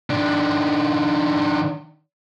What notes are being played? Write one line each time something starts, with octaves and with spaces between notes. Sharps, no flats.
D#3 D4